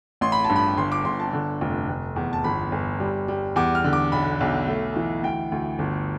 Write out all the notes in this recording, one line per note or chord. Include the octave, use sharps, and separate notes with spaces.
A1 C6
B5
A5
G2
B5
G1 C6
D6
G1 C6
A5
D3
F1
F1
E2
A5
G1 B5
G1
G3
G3
E2 D6
F6
D3
D6
B1 B5
B1
A3
E3
D2 G5
D2
G1